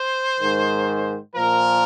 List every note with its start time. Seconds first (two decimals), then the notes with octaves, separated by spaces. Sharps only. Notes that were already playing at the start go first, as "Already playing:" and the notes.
Already playing: C5
0.41 G#2 D#3
1.35 A#2 F3 A#4